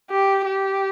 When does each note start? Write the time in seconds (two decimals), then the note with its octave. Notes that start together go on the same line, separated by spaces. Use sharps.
0.10 G4
0.45 G4